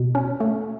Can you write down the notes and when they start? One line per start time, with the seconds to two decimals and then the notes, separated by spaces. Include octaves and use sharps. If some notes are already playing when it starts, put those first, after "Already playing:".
Already playing: B2
0.15 C#4
0.40 A3